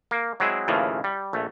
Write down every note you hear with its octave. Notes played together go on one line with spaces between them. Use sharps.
A#3
F#3 G#3 C4 E4 G#4
D#2 A2 C#3 E3 F3
G3
A#1 A3